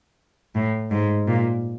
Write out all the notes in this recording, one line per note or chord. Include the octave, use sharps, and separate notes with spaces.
A2
G#2
A#2